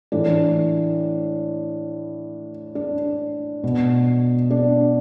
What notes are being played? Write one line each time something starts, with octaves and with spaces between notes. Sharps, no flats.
A2 E3 D4
D4
B2
D4